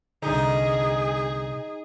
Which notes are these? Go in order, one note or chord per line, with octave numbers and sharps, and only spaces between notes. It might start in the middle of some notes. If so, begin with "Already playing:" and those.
C2 D3 D#4 G#4